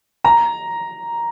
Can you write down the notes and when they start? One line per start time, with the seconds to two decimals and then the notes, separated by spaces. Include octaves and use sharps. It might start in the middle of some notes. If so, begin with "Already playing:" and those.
0.24 A#5